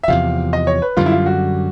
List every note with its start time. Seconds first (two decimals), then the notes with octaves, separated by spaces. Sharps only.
0.03 E5
0.08 E2 C3 F3 F5
0.53 D#5
0.67 C#5
0.82 B4
0.97 F#2 D3 G3 F4
1.06 E4
1.12 F4
1.26 F#4